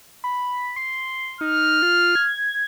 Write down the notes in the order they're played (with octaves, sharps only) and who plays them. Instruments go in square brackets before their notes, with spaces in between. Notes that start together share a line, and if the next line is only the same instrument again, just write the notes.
[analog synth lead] B5
C6
[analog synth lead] D#4 [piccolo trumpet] F6
[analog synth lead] F4
G#6